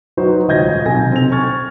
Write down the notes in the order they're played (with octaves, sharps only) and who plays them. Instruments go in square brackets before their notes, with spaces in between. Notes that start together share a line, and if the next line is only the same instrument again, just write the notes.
[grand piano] F#3 D#4 F#4 B4 C5
D#1 C#2 D#5 G6 G#6 A#6
B1 C3 A4 G#5 A#6
C4 F7
C#6 F6 G#6 A6